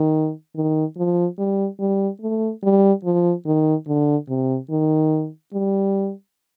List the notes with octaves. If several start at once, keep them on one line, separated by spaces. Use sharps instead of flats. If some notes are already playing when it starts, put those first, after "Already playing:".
Already playing: D#3
D#3
F3
G3
G3
A3
G3
F3
D#3
D3
C3
D#3
G3